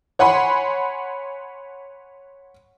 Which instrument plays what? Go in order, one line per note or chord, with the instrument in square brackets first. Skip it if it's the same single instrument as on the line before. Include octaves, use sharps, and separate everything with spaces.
[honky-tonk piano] C#5 F#5 G#5 B5 C6